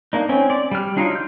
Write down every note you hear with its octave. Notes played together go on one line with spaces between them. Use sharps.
A#3 D4 D#4
C4 C#4
D5
G3 F6
F#3 D4 D#4 F4
E6 G6